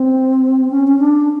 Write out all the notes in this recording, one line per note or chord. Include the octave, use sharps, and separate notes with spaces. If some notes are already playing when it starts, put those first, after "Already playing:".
Already playing: C4
C#4
C#4
D4